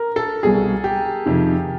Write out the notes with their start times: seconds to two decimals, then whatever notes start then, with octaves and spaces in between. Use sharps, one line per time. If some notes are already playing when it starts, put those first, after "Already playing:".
Already playing: A#4
0.16 A4
0.43 C2 B2 G3 B3 G#4
0.84 G4
1.26 F2 C3 D#3